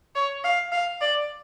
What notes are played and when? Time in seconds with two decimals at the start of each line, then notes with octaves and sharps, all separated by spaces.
0.15 C#5
0.44 F5
0.72 F5
1.01 D5